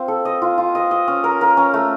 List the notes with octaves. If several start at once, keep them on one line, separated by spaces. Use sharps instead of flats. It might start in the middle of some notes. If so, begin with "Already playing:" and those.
Already playing: C4 F4
A4
D#5
F4
F4
D#5
D#5
C#4
A#4
A#4
C#4
A3